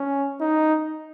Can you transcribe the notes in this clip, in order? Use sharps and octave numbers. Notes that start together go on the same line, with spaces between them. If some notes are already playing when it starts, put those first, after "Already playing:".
Already playing: C#4
D#4